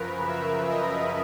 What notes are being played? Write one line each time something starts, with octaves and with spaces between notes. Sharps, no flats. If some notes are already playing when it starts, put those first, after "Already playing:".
Already playing: F#2 C#3 F3 A#4 B4
E5
D#5